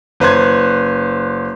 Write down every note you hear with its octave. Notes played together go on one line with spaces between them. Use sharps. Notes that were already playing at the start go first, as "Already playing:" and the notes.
F#1 B4 C5 F#6 G#6